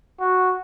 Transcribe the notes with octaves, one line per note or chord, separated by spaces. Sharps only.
F#4